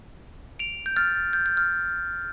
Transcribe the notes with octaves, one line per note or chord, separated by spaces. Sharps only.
D7 F7
G6
F6 A6
G6
G6
F6